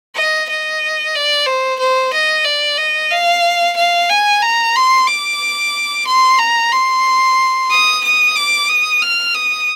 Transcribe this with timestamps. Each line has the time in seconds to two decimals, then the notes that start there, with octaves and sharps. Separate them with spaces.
0.15 D#5
0.49 D#5
1.15 D5
1.46 C5
1.79 C5
2.13 D#5
2.45 D5
2.78 D#5
3.11 F5
3.76 F5
4.10 G#5
4.42 A#5
4.76 C6
5.07 D6
6.07 C6
6.39 A#5
6.72 C6
7.70 D#6
8.04 D#6
8.36 D6
8.69 D#6
9.02 F6
9.34 D#6